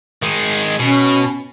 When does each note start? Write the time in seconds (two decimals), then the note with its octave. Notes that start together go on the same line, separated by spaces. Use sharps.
0.22 D#3 G#3
0.79 B2 C#4